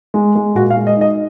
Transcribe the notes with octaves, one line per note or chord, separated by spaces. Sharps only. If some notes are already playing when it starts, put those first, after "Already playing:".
G#3
G#3
A#2 F#4
F5
G#3
D#5
D#4 D#5